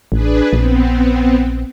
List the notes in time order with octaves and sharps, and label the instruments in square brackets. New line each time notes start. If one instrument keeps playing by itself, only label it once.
[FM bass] A1 [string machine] D4 G#4 B4
[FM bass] A#1 [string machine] B3 C4